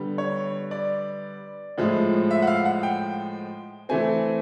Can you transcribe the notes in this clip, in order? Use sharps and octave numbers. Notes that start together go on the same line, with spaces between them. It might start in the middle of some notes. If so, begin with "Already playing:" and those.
Already playing: D3 G3 B3
C#5
D5
A2 F3 G#3
E5
F#5
F5
F#5
G5
E3 A3 C4 G#5